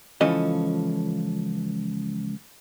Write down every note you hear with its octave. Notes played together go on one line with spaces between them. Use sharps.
C#2 E3 F3 C#4 A4 D#5